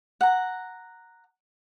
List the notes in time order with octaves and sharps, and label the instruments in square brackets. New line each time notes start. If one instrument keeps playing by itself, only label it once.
[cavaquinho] F#5 A#5